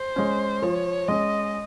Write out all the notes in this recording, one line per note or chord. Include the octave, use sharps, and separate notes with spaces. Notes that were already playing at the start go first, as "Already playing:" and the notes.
Already playing: C5
G#3 C#4
F3 C#5
G#3 C#4 D#5